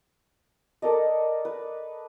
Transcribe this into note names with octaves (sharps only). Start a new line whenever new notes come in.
A4 A#4 D5 D#5
B4